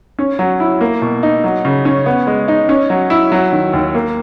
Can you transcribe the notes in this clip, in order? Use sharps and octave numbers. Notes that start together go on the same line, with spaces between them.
C#4
F#3
E4
A#3
B2
D#4
F#3
C#3
C#4
B3
G#3
D#4
C#4
F#3
E4
F#3
D#3
D#2
A#3